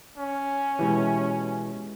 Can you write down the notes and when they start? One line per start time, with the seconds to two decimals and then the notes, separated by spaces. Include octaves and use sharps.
0.18 C#4
0.79 B2 E3 G#3 E4 G4